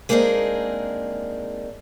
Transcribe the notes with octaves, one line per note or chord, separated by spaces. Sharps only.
G#3 A#3 C4 D4 D#4 G#4